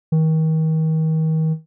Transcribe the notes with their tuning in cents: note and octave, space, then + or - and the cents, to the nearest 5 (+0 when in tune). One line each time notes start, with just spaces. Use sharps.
D#3 +35